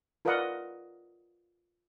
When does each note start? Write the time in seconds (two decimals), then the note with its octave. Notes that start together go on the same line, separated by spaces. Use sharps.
0.25 F4 A#4 B4 D5 D#5 F#5